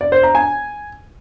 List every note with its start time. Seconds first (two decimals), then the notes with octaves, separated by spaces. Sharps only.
0.01 D5
0.12 C5
0.23 A#5
0.35 G#5